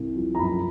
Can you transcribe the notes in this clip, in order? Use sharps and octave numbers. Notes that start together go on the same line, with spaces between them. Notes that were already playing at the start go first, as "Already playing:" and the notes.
Already playing: C2
F3
A#5
F#2 B5